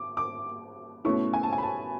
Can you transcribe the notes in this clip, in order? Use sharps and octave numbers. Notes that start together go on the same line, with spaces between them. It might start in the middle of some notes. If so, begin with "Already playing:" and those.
Already playing: D6
D6
B2 A3 C#4 E4 C#6
G#5
A5
G#5
B5
A5